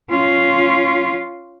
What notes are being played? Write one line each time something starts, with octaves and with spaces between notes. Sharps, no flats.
C#4 F4